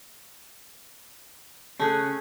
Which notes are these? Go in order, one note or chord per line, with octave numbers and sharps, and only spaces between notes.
C#3 A3 C#4 G#4 F#6